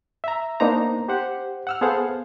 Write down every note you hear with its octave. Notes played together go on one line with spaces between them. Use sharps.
E5 A#5
A#3 B3 D4 D#4 C5 A#5
G4 C5 F#5
F#5 E6 F6
B3 G#4 A4 C5 F5 F#5